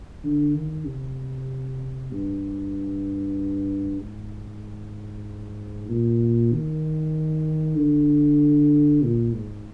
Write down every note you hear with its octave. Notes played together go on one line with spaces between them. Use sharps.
D3
D#3
C3
G2
G#2
A#2
D#3
D3
A#2
G#2